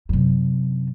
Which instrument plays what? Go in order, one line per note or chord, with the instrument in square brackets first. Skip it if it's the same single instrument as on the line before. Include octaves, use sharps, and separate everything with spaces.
[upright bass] F#2 C3